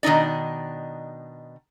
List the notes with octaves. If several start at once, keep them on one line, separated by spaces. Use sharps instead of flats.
B2 D#3 D4 D#4 D5